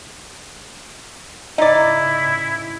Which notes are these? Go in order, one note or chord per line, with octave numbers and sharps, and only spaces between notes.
G#2 C#3 D#4 E4 D5 D#5